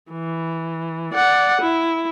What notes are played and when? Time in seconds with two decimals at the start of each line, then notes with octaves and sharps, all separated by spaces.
0.12 E3
1.14 D5 F#5
1.61 E4